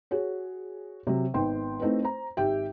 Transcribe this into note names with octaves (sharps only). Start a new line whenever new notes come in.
F#4 G#4 C#5
C3 F#3
G#1 B3 G5 C6
A3 C4 D#4 E4 B4
C5 A#5
G#1 G4 E5 G5